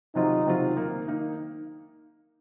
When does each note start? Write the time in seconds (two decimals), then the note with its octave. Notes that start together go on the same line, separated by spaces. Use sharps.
0.15 C3 D#3 F#3 C4 D#4 F4
0.46 C3 D#3 F#3 C4 F4
0.76 D#3 A#3 D#4
1.08 D#3 A#3 D#4